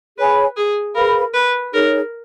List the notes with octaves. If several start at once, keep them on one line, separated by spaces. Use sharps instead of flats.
G#4 B4 C#5 G#5 B5
G#4
G#4 A#4 B4 F5 B5
B4
D#4 G#4 A#4 C#5